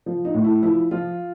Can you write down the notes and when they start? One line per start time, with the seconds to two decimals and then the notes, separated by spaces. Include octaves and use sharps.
0.06 F3
0.25 D#4
0.34 A2
0.44 E4
0.63 F3 E4
0.91 F3 F4